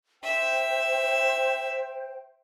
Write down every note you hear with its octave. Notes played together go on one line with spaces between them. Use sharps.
C5 E5 G5